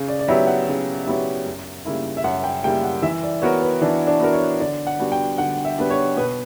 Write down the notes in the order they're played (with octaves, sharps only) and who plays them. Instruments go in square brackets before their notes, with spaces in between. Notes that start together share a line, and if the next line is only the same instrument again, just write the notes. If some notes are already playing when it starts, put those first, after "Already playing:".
Already playing: [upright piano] C#3
[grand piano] D5
D5
[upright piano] F#3 B3 E4 G4 [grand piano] E5
[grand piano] F#5
[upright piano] C#3
F#3 B3 E4 G4
F#2
C#3 G3 A#3 E4
[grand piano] E5
[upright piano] F#2 [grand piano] F#5
[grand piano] G5
[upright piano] C#3 G3 A#3 E4 [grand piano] G5
[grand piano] F#5
[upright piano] E3 [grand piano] E5
[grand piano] D5
[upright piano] B3 F#4 A#4 [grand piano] C#5
[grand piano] B4
[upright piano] E3 [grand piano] D4
[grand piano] D4
[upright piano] B3 F#4 A#4
[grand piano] C#5
[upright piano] D3 [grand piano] D5
[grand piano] F#5
[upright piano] G3 B3 D4 F#4
[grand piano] G5
[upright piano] D3 [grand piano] F#5
[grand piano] E5
[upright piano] G3 B3 D4 F#4 [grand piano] B4
[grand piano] C#5
[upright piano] B2 [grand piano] B4